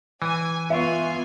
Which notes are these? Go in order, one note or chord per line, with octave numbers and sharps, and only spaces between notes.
E3 G#5
B3 F4 E5 G#5 C#6